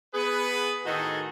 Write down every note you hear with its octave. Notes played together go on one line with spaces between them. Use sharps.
B3 G#4 B4
A2 D#3 D#4 F#4 G#4 A4